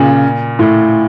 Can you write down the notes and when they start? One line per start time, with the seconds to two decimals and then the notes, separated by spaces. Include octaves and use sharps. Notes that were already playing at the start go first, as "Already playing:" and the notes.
Already playing: A#2 C#3
0.59 A2